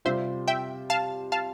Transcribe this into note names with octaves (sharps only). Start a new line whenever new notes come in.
C3 G3 C4 F4 C5 E5
E5 G5
F5 A5
F5 A5